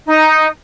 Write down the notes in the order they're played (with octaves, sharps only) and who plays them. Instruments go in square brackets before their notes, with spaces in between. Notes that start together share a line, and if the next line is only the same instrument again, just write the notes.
[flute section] D#4